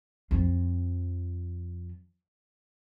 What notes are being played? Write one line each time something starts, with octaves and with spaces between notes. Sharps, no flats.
F2 F3